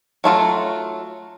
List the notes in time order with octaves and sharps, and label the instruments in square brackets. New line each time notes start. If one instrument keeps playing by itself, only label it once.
[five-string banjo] F#3 A3 F4 F#4